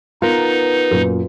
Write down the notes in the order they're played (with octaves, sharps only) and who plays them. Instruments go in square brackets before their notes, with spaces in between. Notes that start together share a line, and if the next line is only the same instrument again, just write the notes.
[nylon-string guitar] B3 [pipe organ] D#4 [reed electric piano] F4 A#4
[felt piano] F#2 A#2